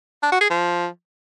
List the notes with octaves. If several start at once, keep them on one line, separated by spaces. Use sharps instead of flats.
D4
F#4
G#4
F3